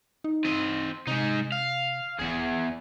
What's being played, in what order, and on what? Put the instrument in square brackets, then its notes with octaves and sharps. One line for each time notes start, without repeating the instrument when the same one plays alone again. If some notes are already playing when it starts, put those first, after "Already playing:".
[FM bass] D#4
[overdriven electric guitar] C4 D#5
[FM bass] C3 [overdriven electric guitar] G#3 D#4
[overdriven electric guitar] F5
[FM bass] D#1 [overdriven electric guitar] E2 G#4